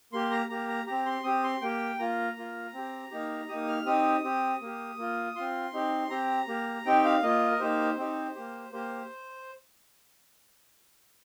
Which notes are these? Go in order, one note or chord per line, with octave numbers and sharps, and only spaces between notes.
A#3 G4 C6
A#5
A#3 G4 A#5
A#5
C4 G4 A#5
C6
C4 G4 D#6
C6
A#3 G4 G5
A#3 F4 A#5
A#3 F4
C4 G4
A#3 D#4 G4
A#3 D#4 G4 D#6
F6
C4 D#4 G4 D#6
C4 G4
A#3 G4
A#3 F4
C4 F4 C6
C4 D#4 G4
C4 G4 A#5
A#3 G4
C4 D#4 G4 G5
F5
A#3 F4 D#5
A#4
A#3 D#4 G4 C5
C4 D#4 G4
A#3 G4
A#3 G4 C5